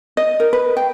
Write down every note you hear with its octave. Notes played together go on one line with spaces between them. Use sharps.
D#5
A#4
B4
G5